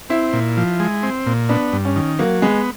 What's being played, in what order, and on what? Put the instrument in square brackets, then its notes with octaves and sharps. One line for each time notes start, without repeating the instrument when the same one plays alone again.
[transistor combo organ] C4 [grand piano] E4
[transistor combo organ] A#2
F3
G#3
C4
A#2
[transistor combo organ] B3 [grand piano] D4
[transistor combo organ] G2
[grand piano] C#4
[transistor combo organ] D#3
[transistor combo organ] F#3 [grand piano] A#3
[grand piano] G#3 [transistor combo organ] B3